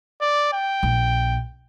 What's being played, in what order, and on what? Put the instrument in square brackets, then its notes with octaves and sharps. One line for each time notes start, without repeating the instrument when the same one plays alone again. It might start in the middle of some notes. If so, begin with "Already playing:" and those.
[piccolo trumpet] D5
G5
[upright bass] A#1